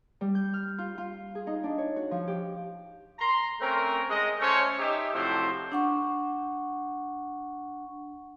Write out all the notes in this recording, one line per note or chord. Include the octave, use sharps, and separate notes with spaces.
G3
G6
F6
F4
F4
G#4
D#4
D4
C#5
F#4
F3
G4
A#5 C6
A3 C4 C#4 A#4
G#3 D#5
A3 C#4 A4 C5 C#5
D#4 G4 E5
A2 C3 F3 F#3 A4 C5
D4 F#5 C#6